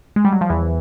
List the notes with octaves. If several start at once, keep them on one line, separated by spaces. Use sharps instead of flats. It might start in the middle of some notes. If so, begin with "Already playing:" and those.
G#3
G3
F#3
F3
E2 E3